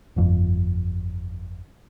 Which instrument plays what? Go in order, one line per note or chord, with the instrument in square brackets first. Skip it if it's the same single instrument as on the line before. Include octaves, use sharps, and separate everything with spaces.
[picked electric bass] G1 F2